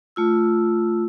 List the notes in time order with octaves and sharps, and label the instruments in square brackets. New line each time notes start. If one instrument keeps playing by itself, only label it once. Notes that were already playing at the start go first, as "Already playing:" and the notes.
[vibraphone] A3 F4 E6